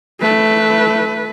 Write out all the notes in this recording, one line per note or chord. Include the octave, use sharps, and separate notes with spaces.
A3 B4